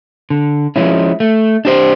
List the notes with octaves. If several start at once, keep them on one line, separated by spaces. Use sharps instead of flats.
D3
F3 G#3 C#4 E4
A3
D4 G4 C5